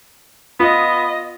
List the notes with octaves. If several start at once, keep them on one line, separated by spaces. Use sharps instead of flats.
B3 F4 D#5